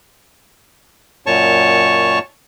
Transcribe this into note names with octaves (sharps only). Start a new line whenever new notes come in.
F#2 A#2 C#5 A5 C#6